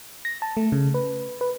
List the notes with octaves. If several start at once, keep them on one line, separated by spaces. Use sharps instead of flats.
A#6
A5
A3
C#3
B4
B4